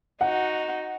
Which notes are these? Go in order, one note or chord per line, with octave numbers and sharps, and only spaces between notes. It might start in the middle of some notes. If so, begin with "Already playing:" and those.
D#4 F#4 F#5